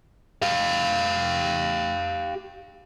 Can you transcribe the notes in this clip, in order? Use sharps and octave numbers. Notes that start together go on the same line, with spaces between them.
G4 F5